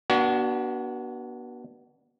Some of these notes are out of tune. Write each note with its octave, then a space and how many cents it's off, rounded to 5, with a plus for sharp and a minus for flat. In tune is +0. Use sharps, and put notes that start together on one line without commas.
B3 -35 D4 +0 F#4 +25